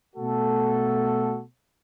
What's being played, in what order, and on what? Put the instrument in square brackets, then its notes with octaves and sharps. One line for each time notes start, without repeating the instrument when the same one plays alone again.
[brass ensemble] B2 A3 F#4 A4